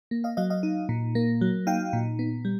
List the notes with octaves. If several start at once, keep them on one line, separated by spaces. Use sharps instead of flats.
A#3
D#5 F5
F#3 D#5 F5
D#5 F5
D#4
A#2
A#3
F#3
D#4 F5 G5
A#2
B3
G3